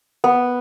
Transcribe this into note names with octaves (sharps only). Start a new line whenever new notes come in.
B3